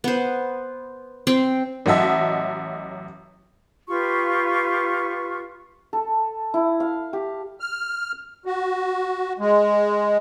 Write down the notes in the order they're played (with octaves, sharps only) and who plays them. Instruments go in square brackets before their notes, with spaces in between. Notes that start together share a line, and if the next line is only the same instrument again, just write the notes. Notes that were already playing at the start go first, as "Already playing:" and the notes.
[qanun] B3 C5
C4 G5 C6
[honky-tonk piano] A1 F#3 F#4 D#5 E5 A5
[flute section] F4 G4 B4 C#6
[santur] A4
E4
F5
G4
[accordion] F6
F#4
G#3